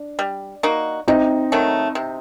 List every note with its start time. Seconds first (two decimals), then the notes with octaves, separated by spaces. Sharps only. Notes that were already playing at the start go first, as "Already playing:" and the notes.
Already playing: D4
0.19 G3
0.63 A#3 D#4 F#4
1.08 C3 C4 D#4
1.52 D#3 F#3 A3
1.95 C3